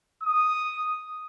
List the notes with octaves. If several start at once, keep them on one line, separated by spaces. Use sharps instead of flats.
D#6